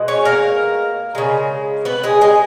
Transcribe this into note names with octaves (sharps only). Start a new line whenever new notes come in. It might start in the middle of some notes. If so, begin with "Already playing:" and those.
Already playing: B2 G#3
C#4 C#5
A#3 A#4
C#3 G#3
B3 B4
G#3 G#4
G#3 G#4